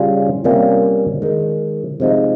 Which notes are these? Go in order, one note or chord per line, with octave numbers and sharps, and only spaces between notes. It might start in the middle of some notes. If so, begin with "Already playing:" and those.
Already playing: C#3 G3 C#4 F4
C3 G3 A#3 C#4 F4
D#3 G#3 D#4
C3 F3 G#3 D#4